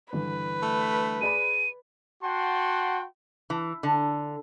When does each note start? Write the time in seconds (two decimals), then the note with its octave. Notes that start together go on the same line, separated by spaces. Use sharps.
0.13 G2 D3 E3 B4
0.63 A3
1.21 G#4 D5 B5 D#7
2.23 F#4 F#5 G5 A5 C6
3.50 E3
3.83 D3